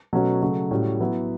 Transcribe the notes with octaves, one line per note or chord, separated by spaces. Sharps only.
B2 F#3 A3 C#4 F#4
C#3 F#3 A3
A2 G3 C#4 F#4
F#3 B3 E4